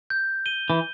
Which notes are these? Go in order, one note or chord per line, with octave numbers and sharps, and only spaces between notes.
G6
D#7 G7
E3